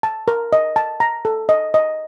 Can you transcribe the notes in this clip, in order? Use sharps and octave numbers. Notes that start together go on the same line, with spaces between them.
A5
A#4
D#5
A5
A#5
A4
D#5
D#5